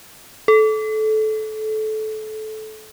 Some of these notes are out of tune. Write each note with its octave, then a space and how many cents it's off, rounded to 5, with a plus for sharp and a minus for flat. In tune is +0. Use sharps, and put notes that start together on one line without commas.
A4 -20